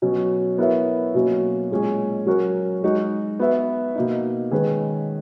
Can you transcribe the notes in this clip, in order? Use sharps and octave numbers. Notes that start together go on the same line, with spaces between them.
B2 F#3 C#4
B3 E4 A#4 C#5 E5
B2 F#3 A#3 C#4 F#4
A#2 G#3 C#4 G#4
F#3 C#4 F#4 A#4 C#5
G#3 D#4 F#4
B3 F#4 B4 E5
B2 A#3 D#4
D#3 G#3 C#4 G#4 B4